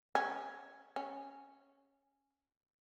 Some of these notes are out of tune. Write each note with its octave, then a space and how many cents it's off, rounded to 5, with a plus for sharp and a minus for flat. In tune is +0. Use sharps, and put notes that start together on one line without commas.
C#4 +0
C#4 -5